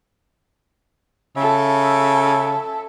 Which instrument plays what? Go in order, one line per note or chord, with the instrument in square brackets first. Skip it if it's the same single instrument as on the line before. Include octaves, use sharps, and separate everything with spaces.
[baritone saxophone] C#3 [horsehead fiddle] A4 E5